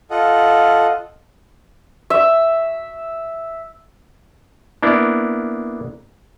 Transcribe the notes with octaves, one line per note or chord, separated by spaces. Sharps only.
F4 A4 D#5 F#5
E5
A#3 B3 D4 E4